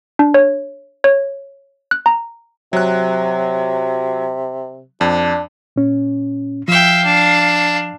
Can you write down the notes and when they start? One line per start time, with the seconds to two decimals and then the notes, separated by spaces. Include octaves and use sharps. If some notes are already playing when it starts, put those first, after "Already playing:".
0.19 D4
0.34 C#5
1.04 C#5
1.91 F#6
2.06 A#5
2.73 C3 F#3 F#6
5.01 F2 D4
5.76 A#2 C#4
6.68 F3 E5 F5 G5
7.05 D4